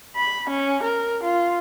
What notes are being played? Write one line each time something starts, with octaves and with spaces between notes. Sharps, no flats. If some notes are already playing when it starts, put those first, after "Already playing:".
B5
C#4
A#4
F4